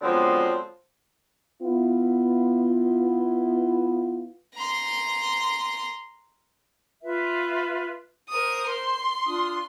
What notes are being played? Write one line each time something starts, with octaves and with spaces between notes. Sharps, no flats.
D3 F3 F#3 G#3 B3 C4
B3 E4 F4
A#5 C6
F4 B4 E5
A#4 C5 D#6
C6
D4 F4 D#6